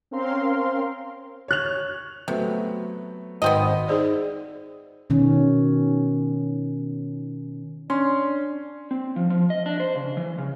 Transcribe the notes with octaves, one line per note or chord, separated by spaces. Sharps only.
C4 C#4 A#4 F5 C6
C#5 F#6 F7
C3 F#3 A3 B3
G#1 B3 C4 D#5
D#4 G#4 C5 D5
B2 D#3 C#4
C#4 D4 C6
C4
F3
F3
D#5
D4
C5
C#3
E3
C#3